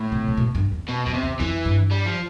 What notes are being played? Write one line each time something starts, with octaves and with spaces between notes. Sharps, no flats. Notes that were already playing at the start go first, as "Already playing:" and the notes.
Already playing: A2
C3
C3
B2
G2
E2
B2
F2 B2
C3
E2
F2 E3
G2
G3
F3